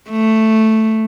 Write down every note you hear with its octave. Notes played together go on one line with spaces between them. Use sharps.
A3